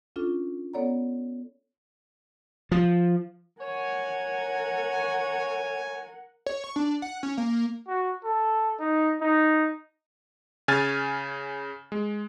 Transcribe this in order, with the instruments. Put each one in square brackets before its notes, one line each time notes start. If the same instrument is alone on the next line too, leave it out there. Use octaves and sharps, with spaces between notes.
[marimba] C#4 D4 F4 A4
B3 A4 C#5 D5 F#5 A#5
[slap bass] F3
[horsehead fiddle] A#4 F#5 [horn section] C#5 [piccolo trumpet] G#5
[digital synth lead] C#5
C#6
D4
F#5
C#4
A#3
[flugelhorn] F#4
A4
D#4
D#4
[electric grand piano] C#3 G#5 F6 G#6 A6
G#3